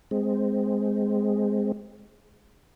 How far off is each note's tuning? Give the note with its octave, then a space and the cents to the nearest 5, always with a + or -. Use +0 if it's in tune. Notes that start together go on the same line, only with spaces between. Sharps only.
G#3 +0 C4 -10